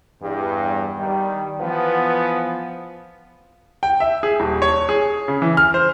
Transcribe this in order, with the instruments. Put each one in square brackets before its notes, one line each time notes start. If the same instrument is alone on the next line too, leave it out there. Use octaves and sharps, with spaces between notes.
[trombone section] E2 G2
D#3 G3
E3 F3 B3
[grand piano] G5
E5
G#4
D#1
C#5
G#4
C#3
E3
F6
C5